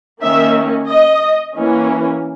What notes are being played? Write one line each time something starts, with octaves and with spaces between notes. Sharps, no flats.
D#3 A#3 C#4 E5
D#5
E3 A#3 C#4